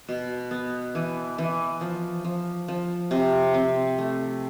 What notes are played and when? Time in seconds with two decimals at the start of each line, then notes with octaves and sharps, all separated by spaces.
0.08 B2
0.51 B3
0.95 E3
1.38 E3
1.81 F3
2.24 F3
2.68 F3
3.11 C3
3.54 C4
3.98 A3